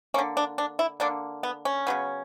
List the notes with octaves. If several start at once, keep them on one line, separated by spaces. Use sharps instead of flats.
D3 A#3 C#4
D4
D4
E4
D3 A#3 D4
B3
C#4
C#3 F#3 B3